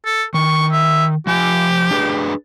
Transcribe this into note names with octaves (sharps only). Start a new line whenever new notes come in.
A4
D#3 C#6
E5
F3 G4 G#5
D4 G#4 B4